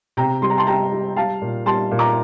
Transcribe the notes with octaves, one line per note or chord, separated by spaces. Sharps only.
C3 G5 A#5
G3 C6
A#5
A5 C6
G3 G5 A#5
G3
G3 F5 A5
A#2
G3 A5 C6
A#2
A#5 D6